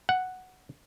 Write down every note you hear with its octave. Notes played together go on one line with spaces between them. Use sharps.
F#5